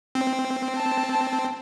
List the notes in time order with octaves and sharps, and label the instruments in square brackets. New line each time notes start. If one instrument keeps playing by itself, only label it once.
[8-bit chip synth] C4
[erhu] A5